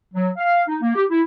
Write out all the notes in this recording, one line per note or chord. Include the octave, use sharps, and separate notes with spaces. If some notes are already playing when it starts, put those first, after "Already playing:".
F#3
F5
D#4
A#3
G4
E4